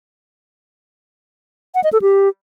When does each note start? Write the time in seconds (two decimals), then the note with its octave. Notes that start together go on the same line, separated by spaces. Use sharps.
1.75 F#5
1.84 D#5
1.93 A4
2.02 G4